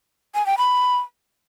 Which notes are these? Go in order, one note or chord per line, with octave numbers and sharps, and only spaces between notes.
G#5
G5
B5